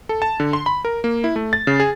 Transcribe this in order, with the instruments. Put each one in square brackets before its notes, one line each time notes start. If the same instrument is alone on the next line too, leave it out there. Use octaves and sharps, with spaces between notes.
[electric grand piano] A4
A5
D3
C6
B5
A#4
A#3
E4
A3
A6
C#3
G#4